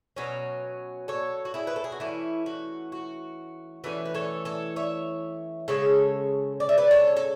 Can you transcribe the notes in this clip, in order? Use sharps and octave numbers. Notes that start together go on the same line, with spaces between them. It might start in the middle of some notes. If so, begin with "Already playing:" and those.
B2 F#3 C#4
A4 C#5
F#4
E4 G#4
B4
A4
G#4
F#4
E3 A3 C#4 E4
F#4
F#4
E3 A3 C#4 F#4
B4
A4 C#5
A4 C#5
C#5 E5
C#3 G#3 C#4 A4 C#5
D5
E5
B4 D5
A4 C#5
A4